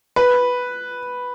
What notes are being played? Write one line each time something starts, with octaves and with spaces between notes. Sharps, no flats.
B4